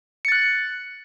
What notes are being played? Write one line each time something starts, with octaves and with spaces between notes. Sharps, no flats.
F#6 A6 C#7